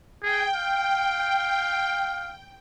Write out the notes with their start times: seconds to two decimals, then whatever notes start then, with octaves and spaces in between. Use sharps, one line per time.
0.23 G#4 G5
0.55 F5